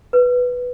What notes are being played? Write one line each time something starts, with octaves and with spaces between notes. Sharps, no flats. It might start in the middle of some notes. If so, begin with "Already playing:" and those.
B4